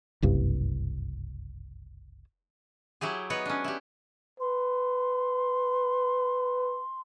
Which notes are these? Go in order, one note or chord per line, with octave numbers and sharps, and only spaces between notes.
F#1 C2 G2
F#3 E4 G4 G#4
B3 D#4 B4 C#5
C#4 D4
E4 G4
B4 C6